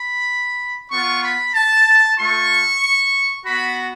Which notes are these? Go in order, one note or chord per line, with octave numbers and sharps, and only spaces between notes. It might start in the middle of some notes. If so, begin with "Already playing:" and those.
Already playing: B5
B3 F4 C#6
B5
A5
A3 F4 C#6
B3 F#4 B5